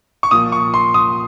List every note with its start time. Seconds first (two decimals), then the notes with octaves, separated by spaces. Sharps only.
0.23 C#6
0.31 A#2 F3 D#6
0.52 C#6
0.74 C6
0.94 D#6